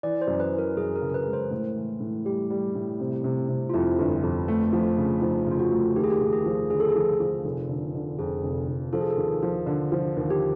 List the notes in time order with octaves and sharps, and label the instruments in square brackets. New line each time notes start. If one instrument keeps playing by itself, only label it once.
[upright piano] E3 [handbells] D5
[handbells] C5
[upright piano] F#2
[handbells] B4
[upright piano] E3
[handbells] A#4
[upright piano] F#2 [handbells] G#4
[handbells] A#4
[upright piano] C#3
[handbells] A#4
B4
[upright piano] G#3
[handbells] C5
[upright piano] A2
E3
A2
[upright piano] G3 [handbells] G4
[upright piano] G3
A2
C3
C3
C3
[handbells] F4
[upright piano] F2 [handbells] E4
[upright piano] G1
F2
A3
F3
C#3
[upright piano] F3 [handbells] D#4
[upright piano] C#3 [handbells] F4
[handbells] F#4
[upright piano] A3
[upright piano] D#2 [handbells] G4
[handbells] G#4
G4
[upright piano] D#2
[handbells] G#4
[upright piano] F3
[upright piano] D3 [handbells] G#4
[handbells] A4
G#4
[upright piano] F3
F3
F1
D3
D3
[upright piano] F2 [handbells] G#4
[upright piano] F1
F1
[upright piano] F3 [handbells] A4
[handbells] G#4
A4
[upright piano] D#2
F3
D3
F3
D#2
[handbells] G4